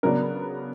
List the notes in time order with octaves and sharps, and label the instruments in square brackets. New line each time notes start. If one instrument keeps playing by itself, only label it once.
[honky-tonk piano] C#3 F#3 B3 D4 A#4